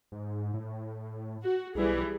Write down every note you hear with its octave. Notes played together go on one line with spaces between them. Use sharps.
G#2
A2
F#4
B1 E3 G3 G#4